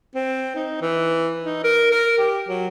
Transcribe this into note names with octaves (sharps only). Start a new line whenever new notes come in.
C4
D#4
E3
D#4
A#4
A#4
G4
F#3